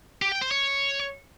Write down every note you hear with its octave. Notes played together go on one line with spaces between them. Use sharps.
G4
G5
C5
C#5